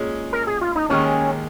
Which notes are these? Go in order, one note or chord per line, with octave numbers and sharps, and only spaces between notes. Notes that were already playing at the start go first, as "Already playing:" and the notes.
Already playing: A#2 G#3 C#4 G#4
A#4
G#4
F4
D#4
D#2 D#3 G#3 C#4